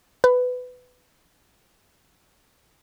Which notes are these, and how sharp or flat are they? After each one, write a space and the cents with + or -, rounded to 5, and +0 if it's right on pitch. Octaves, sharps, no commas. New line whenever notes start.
B4 +15